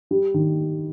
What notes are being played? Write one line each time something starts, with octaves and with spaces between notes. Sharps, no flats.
G3
D#3